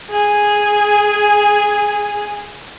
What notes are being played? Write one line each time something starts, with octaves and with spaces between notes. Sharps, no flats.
G#4 G#5